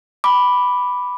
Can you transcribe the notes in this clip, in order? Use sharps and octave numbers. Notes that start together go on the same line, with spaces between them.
B5 D6